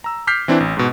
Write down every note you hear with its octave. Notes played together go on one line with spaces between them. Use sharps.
A#5 E6
D6 F6 G6 B6 C7
E3 C4 D4 E4
A1
G#2 B2